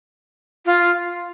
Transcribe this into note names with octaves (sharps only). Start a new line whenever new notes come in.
F4